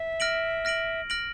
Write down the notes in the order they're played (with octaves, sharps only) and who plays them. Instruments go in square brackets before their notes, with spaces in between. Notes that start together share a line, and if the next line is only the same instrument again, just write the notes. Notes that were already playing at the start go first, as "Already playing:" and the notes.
Already playing: [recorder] E5
[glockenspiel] F6 A#6 D7 F#7
F6 A#6 D7 F#7
F6 A#6 D7 F#7